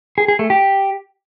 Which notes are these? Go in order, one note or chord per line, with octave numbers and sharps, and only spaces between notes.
G#4
G#4
A3
G4